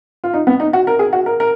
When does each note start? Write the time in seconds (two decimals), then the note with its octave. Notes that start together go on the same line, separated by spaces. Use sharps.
0.24 F4
0.34 D#4
0.47 B3
0.60 D#4
0.73 F#4
0.87 A#4
0.99 G#4
1.13 F#4
1.26 A#4
1.40 A#4